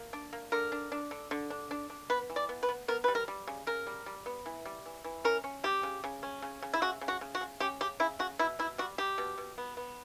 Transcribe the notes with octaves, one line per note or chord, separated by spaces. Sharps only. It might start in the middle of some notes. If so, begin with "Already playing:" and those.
Already playing: A#3
D4
A#3
D3 A#4
D4
D4
D3
D3
D4
D4
D4
B3 B4
E3
D5
B3
B4
B3
B3 A#4
G3 B4
A#4
G3
C#3
C#3 A#4
G3
G3
B3
E3
G3
E3
E3
C#4 A#4
C#4
G3 G4
C#3
C#3
C#4
C#3
C#3
E4
C#3 F#4
C#3
F#4
C#3
F#4
C#3
C#4 G4
C#3 G4
C#3 E4
C#3 F#4
B2 E4
B2 E4
G3 F#4
G3 G4
B2
B2
B3
B3